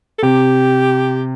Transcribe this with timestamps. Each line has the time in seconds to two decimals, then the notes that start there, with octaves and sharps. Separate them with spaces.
0.19 A4
0.22 C3 G4